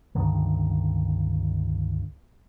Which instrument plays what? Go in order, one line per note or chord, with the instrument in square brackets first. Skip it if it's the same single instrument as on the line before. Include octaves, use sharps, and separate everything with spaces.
[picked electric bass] C#2 G2 D3 D#3